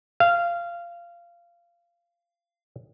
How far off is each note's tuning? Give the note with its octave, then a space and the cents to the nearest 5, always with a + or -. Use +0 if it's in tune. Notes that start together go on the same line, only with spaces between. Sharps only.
F5 -20